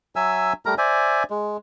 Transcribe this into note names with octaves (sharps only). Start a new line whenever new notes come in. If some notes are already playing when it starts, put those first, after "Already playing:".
F#3 E5 G#5 E6
G3 A3 A#4 A#5
C5 D5 E5 G#5
G#3